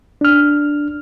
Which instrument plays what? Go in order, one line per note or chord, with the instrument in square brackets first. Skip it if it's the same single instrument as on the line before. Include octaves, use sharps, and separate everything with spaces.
[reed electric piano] D4 F6